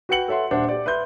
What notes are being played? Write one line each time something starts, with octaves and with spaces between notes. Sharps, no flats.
F#4 B4 F#5 G5 C#7 F#7
A4 C#5 E5 F#5 C6
D#1 D4 C5 E5 F#5
G4 D5
B4 E5 C6 G6